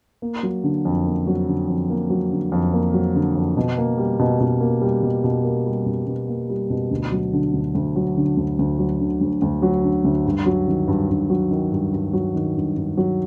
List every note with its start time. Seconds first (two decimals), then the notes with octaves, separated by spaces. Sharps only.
0.22 A#3
0.43 F#3
0.64 D3
0.85 F2
1.06 A#3
1.27 F#3
1.48 D3
1.68 F2
1.90 A#3
2.10 F#3
2.31 D3
2.52 F2
2.73 A#3
2.94 F#3
3.15 D3
3.35 F2
3.57 B2
3.78 A#3
3.98 G3
4.19 B2
4.40 B2
4.61 A#3
4.82 G3
5.03 B2
5.24 B2
5.44 A#3
5.66 G3
5.86 B2
6.07 B2
6.28 A#3
6.50 G3
6.70 B2
6.91 D2
7.12 F#3
7.33 D3
7.53 D2
7.75 D2
7.96 F#3
8.17 D3
8.37 D2
8.59 D2
8.79 F#3
9.00 D3
9.21 D2
9.42 D2
9.62 F#3
9.84 D3
10.04 D2
10.26 G2
10.46 F#3
10.68 D#3
10.88 G2
11.10 G2
11.30 F#3
11.51 D#3
11.72 G2
11.92 G2
12.13 F#3
12.35 D#3
12.56 G2
12.76 G2
12.97 F#3